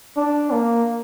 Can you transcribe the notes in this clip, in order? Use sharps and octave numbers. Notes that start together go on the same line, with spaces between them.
D4
A#3